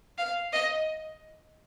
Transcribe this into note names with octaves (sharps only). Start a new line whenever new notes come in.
F5
D#5